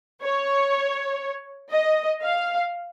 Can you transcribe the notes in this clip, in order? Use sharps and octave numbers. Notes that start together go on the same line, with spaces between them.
C#5
D#5
F5